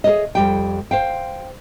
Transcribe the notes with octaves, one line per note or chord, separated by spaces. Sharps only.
G#4 A#4 C#5 D#5
F2 G3 G5
C5 F5 G5